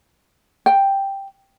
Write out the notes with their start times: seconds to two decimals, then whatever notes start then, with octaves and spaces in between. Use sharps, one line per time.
0.66 G5